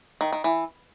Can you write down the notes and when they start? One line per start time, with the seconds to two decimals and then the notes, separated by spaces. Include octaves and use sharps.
0.21 D#3
0.32 D#3
0.44 E3